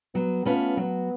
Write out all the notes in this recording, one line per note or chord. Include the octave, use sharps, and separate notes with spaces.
F#3 B3
A3 B3 C#4 F4 B4
F#3 B3